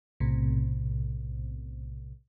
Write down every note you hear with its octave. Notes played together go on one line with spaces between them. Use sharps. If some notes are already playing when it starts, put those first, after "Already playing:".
B1 A2 C3